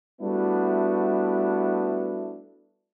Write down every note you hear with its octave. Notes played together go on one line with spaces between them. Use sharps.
G3 A3 B3 D4 E4 F#4